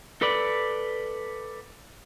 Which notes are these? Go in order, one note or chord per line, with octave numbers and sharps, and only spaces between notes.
A4 B4 D5